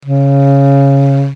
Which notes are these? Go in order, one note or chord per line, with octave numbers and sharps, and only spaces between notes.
C#3